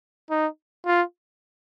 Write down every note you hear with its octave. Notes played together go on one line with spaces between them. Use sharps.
D#4
F4